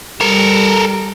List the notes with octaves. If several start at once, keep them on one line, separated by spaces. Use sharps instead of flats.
G3 A4 A#4